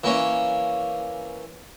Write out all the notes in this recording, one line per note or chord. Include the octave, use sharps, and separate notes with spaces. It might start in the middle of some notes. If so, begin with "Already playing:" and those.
E3 A#3 C#4